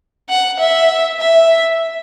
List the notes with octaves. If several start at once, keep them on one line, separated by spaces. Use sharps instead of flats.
F#5
E5
E5